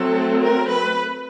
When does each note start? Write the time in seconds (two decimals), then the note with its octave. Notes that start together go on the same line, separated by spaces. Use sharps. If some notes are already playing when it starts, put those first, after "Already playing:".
Already playing: F#3 A3 C4 A4
0.42 A#4
0.72 B4